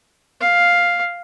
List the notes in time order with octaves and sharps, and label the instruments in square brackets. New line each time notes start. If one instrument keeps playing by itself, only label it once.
[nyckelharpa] F5